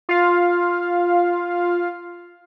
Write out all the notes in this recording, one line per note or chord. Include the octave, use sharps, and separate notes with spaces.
F4 F5